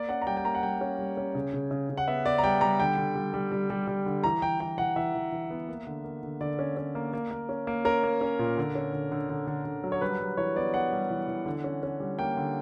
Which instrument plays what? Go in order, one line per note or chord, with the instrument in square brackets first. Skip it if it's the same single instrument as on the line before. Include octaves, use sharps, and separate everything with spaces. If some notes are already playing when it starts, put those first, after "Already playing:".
Already playing: [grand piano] A#3 D5
C#4 F#5
A#5
G3 G5
G5
A#3 A#5
F#5
G3 G5
C#4
G3
C#4
C#3
C#3
C#3
C#3
F#5
B3 E5
B3 D5
A#5
G3 G5
G3 A#5
D3 G5
D3
G3
G3
G3
G3
G3
D3
E3 A#5
E3 G5
E3 G5
E3 F#5
E3 E5
E3
E3
B3
A#3
D3
A#3
D3
D3 D5
C#4
C#4
A#3
A#3
A#3
C#4
A#3
C#4 A#4
A#3
C#4
A#2
D3
C#4
D3
D3
D3
D3
D3
F#3
C#5
G3 B4
G3
E3 C#5
B3 D5
B3 F#5
G3
E3
E3
D3
C#4
C#4
G3
A#3 G5
D3